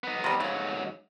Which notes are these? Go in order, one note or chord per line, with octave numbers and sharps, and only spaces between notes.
B3 D#4
C3 G3
G#2 C#3 F#3